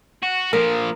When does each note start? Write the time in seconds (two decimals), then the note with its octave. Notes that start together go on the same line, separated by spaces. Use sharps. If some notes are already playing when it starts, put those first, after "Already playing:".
0.22 F#4
0.53 A#2 F3 A#4